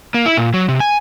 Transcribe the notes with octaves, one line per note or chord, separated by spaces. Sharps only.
A#3
E4
A#2
F#3
C3
G#5